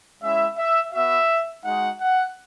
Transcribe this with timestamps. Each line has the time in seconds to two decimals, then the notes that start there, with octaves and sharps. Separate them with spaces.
0.22 G#3 C#4 E4 E5
0.57 E5
0.93 B3 F#4 E5
1.64 G#3 D#4 F#4 F#5
2.00 F#5